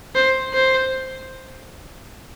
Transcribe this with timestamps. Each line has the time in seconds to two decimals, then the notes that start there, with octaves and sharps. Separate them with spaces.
0.15 C5
0.54 C5